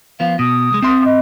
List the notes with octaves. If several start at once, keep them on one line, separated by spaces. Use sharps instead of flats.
F3 B3 F5
B2 D#6
C2 G#3
C4 E5 C6
D#5